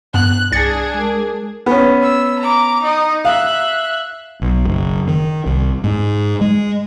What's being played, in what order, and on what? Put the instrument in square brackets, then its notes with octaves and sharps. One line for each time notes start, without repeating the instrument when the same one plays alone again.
[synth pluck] G2 B3 [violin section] F#6
[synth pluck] C2 A6 C#7 [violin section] D4 G#4
[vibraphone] G#3 A#4
[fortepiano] B3 C#4
[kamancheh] E6
A#5 D6
D#4 D#5
[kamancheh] E5 F#6 [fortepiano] F5
[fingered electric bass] B1
F#1
D#3
C2
G#2
G#3